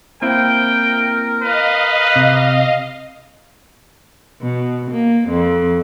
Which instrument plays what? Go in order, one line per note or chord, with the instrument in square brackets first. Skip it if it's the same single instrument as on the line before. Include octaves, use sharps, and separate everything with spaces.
[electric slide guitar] A#3 C4 E4 [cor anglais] A#4 [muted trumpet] G5
[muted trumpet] B4 [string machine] D#5 F5
[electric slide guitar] C3
[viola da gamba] B2
A#3
F2